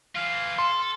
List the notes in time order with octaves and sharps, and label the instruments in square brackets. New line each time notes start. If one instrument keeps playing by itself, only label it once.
[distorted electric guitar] E3 F4 [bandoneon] F5
[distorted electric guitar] A4 [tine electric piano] C6